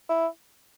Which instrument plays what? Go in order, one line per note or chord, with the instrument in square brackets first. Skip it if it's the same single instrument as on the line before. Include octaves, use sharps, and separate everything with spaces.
[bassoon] E4